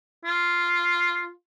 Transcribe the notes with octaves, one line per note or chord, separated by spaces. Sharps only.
F4